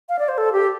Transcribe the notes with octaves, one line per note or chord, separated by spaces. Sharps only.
F5
D5
C5
A4
G4